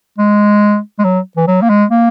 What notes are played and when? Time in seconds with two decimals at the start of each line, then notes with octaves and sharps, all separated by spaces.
0.18 G#3
0.99 G#3
1.04 F#3
1.37 E3
1.47 F#3
1.62 A#3
1.70 G#3
1.90 A#3